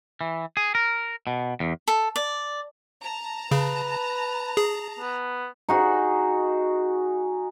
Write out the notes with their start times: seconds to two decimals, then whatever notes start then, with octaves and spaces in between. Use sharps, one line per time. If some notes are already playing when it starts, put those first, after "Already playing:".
0.21 E3
0.57 G#4
0.75 A#4
1.27 B2
1.60 E2
1.88 A4
2.16 D5
3.02 A5 A#5
3.51 C#3 B4
4.57 G#4
4.99 B3
5.69 D#4 F#4 G#4